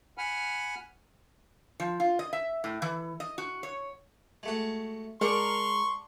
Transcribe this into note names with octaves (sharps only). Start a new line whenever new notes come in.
F#5 G#5 B5 F6
F3
F4
D#5
E5
A2
E3
D#5
F#4
C#5
G#3 A3 F#4
G#3 D4 A#4 F#5 C6 C#6